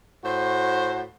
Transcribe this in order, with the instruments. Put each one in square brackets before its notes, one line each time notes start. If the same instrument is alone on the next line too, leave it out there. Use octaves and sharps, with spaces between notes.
[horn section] A2 F#4 C5